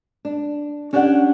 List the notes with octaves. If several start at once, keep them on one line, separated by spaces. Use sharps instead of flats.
D4
C#4 D4 G4 D5 F5 F#5